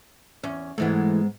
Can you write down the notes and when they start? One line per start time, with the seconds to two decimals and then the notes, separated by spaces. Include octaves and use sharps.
0.44 E2 C#4
0.78 G#2 E3 G#3 A3 B3